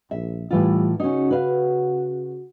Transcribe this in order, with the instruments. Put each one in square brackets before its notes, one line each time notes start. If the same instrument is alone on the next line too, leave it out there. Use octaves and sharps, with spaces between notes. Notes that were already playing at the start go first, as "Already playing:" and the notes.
[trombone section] A#1 [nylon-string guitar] E5
[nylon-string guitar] A2 E3 F4 [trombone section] G3
[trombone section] C#3 F#4 [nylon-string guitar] C#4 D#4
[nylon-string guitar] B4 F5